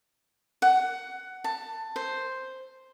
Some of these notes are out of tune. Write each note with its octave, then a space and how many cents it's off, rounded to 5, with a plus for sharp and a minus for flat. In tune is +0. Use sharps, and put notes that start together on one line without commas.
F#5 +15
A5 +15
C5 +0